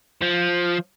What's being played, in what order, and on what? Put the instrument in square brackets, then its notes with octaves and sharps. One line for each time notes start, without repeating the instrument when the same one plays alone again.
[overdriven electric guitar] F3